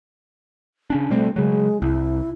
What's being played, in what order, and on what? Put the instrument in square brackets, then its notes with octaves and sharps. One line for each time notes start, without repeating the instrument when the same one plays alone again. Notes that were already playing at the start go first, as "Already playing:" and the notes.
[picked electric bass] C#3 C#4 D4
[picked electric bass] B2 G3 C4 [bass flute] A3
[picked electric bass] C#3 F#3 [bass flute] G#3
[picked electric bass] C2 [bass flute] E4